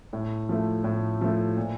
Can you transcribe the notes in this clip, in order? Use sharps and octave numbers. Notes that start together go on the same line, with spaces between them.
A2
F3 A3
A2
F3 A3
A#2